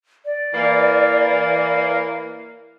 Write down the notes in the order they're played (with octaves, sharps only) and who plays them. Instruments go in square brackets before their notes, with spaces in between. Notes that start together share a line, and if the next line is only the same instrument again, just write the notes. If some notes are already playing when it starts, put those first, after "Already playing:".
[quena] D5
[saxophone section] E3 A#3